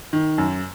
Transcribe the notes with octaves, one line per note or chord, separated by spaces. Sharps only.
D#3
F#2